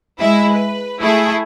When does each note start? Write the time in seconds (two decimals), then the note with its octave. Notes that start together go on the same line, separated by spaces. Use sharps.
0.19 G#3 E4 E5
0.52 B4
1.01 A3 E4 G#4 A4